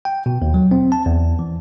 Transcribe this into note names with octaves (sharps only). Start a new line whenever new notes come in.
G5
B2
D#2
F#3
C4
A5
E2
E3